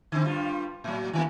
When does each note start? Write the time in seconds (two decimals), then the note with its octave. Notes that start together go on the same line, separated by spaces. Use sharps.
0.12 D3 C4
0.24 G2 G3 F4
0.84 A2 F#3
1.13 D#3 E3 A#3